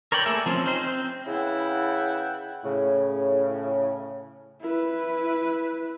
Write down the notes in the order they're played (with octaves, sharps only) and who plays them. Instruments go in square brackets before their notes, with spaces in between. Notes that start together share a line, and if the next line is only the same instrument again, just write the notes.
[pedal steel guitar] A#4 C#5 D5 G5 B5
A3 A#3 G#4 A#4 E5
F3 C4 C#4
C4 C#4 D#4 C5
C4
[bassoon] C#3 [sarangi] E4 [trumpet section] B4 F#5 G5
[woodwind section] A2 C#3
[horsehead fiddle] E4 B4